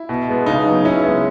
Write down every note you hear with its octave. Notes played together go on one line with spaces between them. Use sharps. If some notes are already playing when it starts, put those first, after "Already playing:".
Already playing: E4
B2
G#3 B3
C#3 D#4
F#3 B3
C#3 C#4 E4
G#3 B3